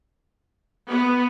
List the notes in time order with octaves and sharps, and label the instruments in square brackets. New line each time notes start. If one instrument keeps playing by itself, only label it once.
[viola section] B3